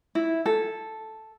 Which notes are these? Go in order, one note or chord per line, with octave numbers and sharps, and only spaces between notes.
E4
A4